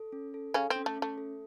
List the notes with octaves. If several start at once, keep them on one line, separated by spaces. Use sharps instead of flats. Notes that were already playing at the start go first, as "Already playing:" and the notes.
Already playing: A4
C#4
A4
C#3 C#4 A4
C4
C#4
A3
C#4
A3
A4